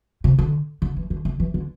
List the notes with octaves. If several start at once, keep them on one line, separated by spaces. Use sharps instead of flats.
C3
D3
D3
E3
D3
D3
E3
D3